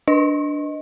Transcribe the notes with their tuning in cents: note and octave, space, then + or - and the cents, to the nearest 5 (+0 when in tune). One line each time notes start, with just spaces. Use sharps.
D4 +0 D#5 +0